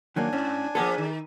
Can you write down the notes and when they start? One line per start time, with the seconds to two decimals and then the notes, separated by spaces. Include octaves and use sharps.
0.16 D#3 F#3 A#3 D4 G#5
0.33 G#2 C#4
0.75 F3 A#3 B3 G#4 A4
0.98 D#3